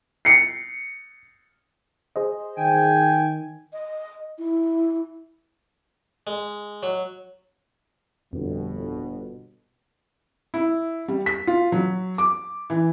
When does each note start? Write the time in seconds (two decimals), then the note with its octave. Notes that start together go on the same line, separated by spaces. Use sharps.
0.25 C7 C#7
2.16 G#4 C5 D#5
2.58 D#3 G5 G#5
3.73 D#5
4.38 E4
6.27 G#3
6.83 F#3
8.33 G1 F2 B2
10.54 E4
11.08 G3
11.26 B6
11.47 F4
11.72 F#3
12.18 D6
12.70 E3